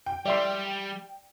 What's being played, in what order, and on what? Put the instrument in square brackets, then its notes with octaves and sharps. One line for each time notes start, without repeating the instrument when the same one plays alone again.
[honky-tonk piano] G5
[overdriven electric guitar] G3 [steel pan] D5 E5 C6